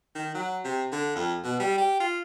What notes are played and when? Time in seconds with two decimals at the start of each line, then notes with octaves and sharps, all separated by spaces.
0.15 D#3
0.35 F#3
0.64 C3
0.92 D3
1.16 F2
1.44 B2
1.60 G3
1.78 G4
2.00 F4